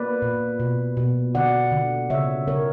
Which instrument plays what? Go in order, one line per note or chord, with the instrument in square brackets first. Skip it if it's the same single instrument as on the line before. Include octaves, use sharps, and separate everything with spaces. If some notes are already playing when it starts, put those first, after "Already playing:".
Already playing: [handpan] A#3 B4 D5
A#2
B2
B2
D3 D5 F#5
D3
C#3 C#5 E5
C#3 A#4 C#5